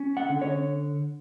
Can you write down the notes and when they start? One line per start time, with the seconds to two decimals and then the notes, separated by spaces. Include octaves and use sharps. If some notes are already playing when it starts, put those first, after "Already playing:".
Already playing: C#4
0.17 F#5
0.29 D3
0.42 C#5